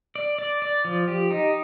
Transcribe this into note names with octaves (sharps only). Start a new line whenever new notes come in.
D5
D5
D5
F3
G4
D#4